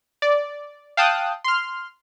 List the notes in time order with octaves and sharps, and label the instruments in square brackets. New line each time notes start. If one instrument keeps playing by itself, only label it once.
[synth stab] D5
F5 G5 A5 D#6 F#6
C6 F6